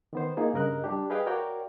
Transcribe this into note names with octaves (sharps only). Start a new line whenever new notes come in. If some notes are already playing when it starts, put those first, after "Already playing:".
D#3 B3 C5
A#3 D#4 F4 G#4
G2 C#3 A#4 D#5 F#6
G3 D4 G4
G#4 B4 D#5 F5 G5
F#4 A#4 C#5 D5 F5 G5